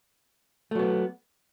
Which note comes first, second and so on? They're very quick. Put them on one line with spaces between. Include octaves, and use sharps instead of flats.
A3 F#3 B3